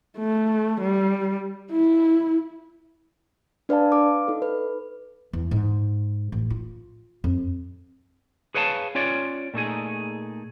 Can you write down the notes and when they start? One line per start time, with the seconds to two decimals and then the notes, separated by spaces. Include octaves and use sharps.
0.18 A3
0.81 G3
1.71 E4
3.69 D4 B4 D5 F5 A5
3.92 B4 F5 D6
4.28 D#4 A4
4.42 B4
5.33 E2
5.51 G#2
6.32 A1
6.50 F4
7.24 F2
8.55 G#4 B4 C#5 F5 F#5 A5
8.95 C#4 F4 C#5 D5
9.54 A#2 A3 D#4 G#4